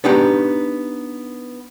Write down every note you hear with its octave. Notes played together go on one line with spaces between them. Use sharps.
B3 D4 D#4 G4